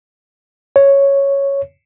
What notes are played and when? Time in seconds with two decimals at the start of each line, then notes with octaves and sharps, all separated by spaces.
0.76 C#5